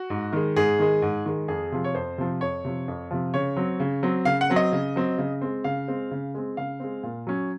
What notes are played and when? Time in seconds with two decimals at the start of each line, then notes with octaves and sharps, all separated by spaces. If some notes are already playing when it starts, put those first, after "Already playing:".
Already playing: F#4
0.10 G#2
0.33 D#3 G#3
0.56 G#2 G#4
0.79 D#3 G#3
1.02 G#2
1.25 D#3 G#3
1.48 F2 G#4
1.72 C3 F3
1.84 C#5
1.95 F2 C5
2.18 C3 F3
2.41 F2 C#5
2.65 C3 F3
2.88 F2
3.11 C3 F3
3.34 C#3 C#5
3.57 F#3 C4
3.80 C#3
4.03 F#3 C4
4.25 C#3 F5
4.41 F#5
4.50 F#3 C4
4.56 D#5
4.72 C#3
4.96 F#3 C4
5.18 C#3
5.41 G#3 C4
5.64 C#3 F5
5.88 G#3 C4
6.11 C#3
6.35 G#3 C4
6.57 C#3 F5
6.80 G#3 C4
7.03 A#2
7.27 F#3 C#4